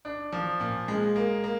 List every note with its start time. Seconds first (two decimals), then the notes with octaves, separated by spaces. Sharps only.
0.05 D4
0.33 F3
0.60 A#2
0.88 G#3
1.16 A#3
1.44 A#3